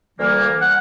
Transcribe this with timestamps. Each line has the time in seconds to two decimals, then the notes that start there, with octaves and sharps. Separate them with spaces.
0.19 D2 E3 G3 A#3
0.61 F#5